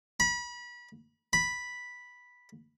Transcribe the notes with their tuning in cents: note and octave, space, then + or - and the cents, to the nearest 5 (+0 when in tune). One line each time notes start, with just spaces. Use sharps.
B5 -30
B5 -5